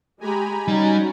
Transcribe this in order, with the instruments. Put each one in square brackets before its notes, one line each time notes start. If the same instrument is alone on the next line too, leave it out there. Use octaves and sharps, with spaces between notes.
[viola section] G#3 G4 [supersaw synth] G#5 A#5 B5
[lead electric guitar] G3 [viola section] C#4 F#4 [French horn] D#4